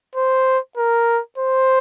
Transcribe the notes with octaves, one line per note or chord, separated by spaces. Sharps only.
C5
A#4
C5